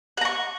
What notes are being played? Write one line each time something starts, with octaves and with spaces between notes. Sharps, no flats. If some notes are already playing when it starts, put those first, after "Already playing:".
F#5 A#5 C#6